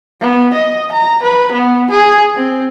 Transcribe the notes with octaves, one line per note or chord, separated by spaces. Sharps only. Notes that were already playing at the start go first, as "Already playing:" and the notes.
B3
D#5
A#5
B4
B3
G#4
C4